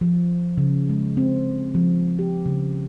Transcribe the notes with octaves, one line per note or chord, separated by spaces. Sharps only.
F3
C#3
G#3
C4
F3
G4
C#3